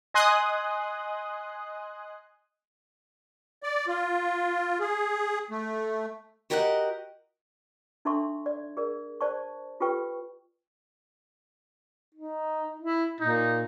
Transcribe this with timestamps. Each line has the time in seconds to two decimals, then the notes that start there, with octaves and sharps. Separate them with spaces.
0.14 D#5 G#5 C6 D#6 F#6
3.63 D5
3.87 F4
4.80 G#4
5.51 A3
6.50 F#4 G4 A#4 D#5 E5 F#5
8.05 D4 D#4 A4 E5 C6 C#6
8.46 D5
8.77 G#4 A#4 D5
9.21 C5 D5 A5 C#6
9.80 F4 G4 A4 B4 G5 C#6
12.15 D#4
12.80 E4
13.20 A#2 D#4